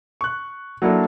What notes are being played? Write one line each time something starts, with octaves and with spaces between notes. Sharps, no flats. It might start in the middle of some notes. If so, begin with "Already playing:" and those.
C#6 F#6
F#3 A#3 D4 E4 A4